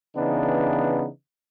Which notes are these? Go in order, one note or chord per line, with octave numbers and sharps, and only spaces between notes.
C#3 E3 B3 D4 D#4